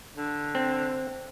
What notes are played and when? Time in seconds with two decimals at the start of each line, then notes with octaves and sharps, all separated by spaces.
0.16 D3
0.55 C4